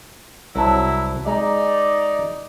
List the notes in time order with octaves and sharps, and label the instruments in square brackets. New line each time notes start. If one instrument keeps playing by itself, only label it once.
[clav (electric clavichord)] C2 A5 [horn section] F#3 E4
[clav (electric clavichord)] G#3 A#5 [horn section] D#4 D5